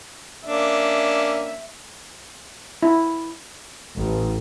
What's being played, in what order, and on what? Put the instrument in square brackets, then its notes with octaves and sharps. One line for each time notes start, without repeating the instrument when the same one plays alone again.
[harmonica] A#3 C#4 D4 [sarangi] E5
[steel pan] E4
[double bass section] A1